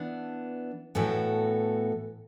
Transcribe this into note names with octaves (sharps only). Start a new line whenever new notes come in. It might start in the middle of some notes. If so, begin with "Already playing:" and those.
Already playing: E3 B3 D4
A2 E3 B3 F#4 A4